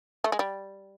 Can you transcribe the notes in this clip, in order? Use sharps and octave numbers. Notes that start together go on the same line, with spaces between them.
A3
G#3
G3